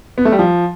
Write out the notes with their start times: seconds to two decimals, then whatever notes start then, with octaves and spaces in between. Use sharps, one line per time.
0.18 B3
0.25 A3
0.32 G3
0.39 F3